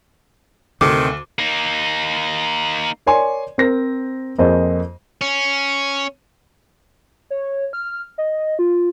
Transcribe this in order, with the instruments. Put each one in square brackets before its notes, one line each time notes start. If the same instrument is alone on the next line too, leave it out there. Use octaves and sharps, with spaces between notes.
[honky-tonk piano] D2 A4 [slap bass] C3 [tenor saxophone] D#3 [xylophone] D6
[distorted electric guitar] A#3 D#4
[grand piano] A#4 C#5 D5 G#5 C6
C4 A#4 C5 A#6
F2 A#3 G#4 C5 D#5
[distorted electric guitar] C#4
[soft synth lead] C#5
F6
D#5
F4